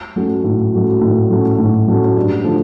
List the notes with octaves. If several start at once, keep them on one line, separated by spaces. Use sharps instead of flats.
F#3 A3 C#4 F#4
A2
F#3 A3 C#4 F#4
A2
F#3 A3 C#4 F#4
A2
F#3 A3 C#4 F#4
G2
D3 F3 A3